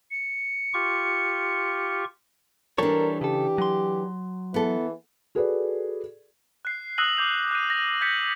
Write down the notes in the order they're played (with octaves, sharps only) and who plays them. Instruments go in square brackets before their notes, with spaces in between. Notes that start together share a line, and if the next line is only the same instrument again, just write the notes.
[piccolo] C#7
[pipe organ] F4 G4 C#6
[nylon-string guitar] E3 D4 [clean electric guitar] G3 A4 C#5 [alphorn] A#4
[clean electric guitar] C#3 A4 [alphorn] G4
[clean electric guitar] F#3 C6
[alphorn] E3 [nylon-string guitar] B3 A4
[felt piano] F#4 G#4 A4 B4 D5
[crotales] F#6 C7
D#6 E6 F#6 A#6 D#7 F#7
D6 G6 F7
F#6 D#7
A#6
G6 G#6 A#6 B6 C#7 F#7